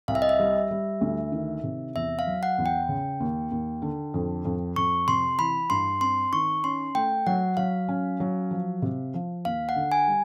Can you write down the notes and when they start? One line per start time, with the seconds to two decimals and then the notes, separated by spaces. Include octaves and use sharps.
0.08 C2 F5
0.15 E5
0.22 D#5
0.29 E5
0.39 G3
0.71 G3
1.01 D2
1.32 D#3
1.64 C3
1.96 E2 E5
2.19 F5
2.27 F#3
2.43 F#5
2.58 E2
2.66 G5
2.89 C#3
3.20 D#2
3.51 D#2
3.82 D3
4.14 F2
4.45 F2
4.76 F2 C#6
5.08 C3 C6
5.38 E3 B5
5.70 G2 C6
6.01 C4 C6
6.33 D#3 C#6
6.64 C#4 C6
6.95 A3 G5
7.27 F#3 F#5
7.57 F#3 F5
7.89 C#4
8.20 F#3
8.51 F3
8.82 C3
9.14 F3
9.45 D#2 F5
9.69 F#5
9.76 D3
9.92 G#5
10.08 G3